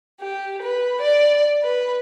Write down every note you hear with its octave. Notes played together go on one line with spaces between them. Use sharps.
G4
B4
D5
B4